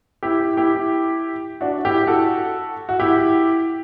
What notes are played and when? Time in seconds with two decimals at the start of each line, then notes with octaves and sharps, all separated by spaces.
0.23 E4 G4
0.57 E4 G4
1.61 D4 F#4
1.85 E4 G4
2.07 F#4 A4
2.89 F#4
3.00 E4 G4